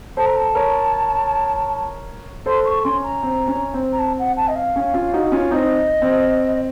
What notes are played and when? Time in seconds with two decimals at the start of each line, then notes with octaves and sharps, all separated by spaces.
0.17 A4 C5 A5
0.26 A#5
0.36 A5
0.55 A#4 C#5
2.46 A4 C5 C6
2.65 C#6
2.84 C#4 C6
3.04 A#5
3.23 C4
3.48 C#4
3.74 C4
3.93 A#5
3.99 A5
4.19 F#5
4.37 A5
4.48 D#5
4.56 F5
4.76 C#4
4.94 C#4 F4
5.13 D#4 F#4
5.32 C#4 F4
5.51 C4 D#4 D#5
6.02 C4